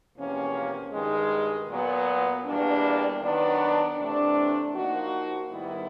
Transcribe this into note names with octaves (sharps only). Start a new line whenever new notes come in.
E2 C3 F3 A#3 C#4
G2 D#3 G#3
A#2 F#3 B3
E2 B2 G3 A#3 D4
D#3 F#3 B3 D4
C3 E3 A3 D4
F3 A#3 D#4 F#4
G#2 D#3 G3 B3 E4